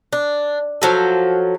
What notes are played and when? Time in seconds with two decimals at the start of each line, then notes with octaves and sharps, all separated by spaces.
0.13 D4
0.82 F3 F#3 A4